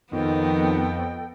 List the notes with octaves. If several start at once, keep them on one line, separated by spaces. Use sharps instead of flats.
F2 D#3 B3 A4 D#5 G5